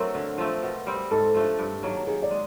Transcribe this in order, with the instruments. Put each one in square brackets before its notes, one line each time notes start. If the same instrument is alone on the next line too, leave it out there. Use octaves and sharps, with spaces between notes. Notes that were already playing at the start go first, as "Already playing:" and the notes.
Already playing: [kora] F#3 A3 C4 D4 [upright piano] A#4
[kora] D3
F3 A3 C4
B2
G3 C4
[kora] G#2 [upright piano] A4
[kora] F3 A3 D4
G2
D#3 F#3 A#3
[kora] D#3 [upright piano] G#4
[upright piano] D5
[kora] G#3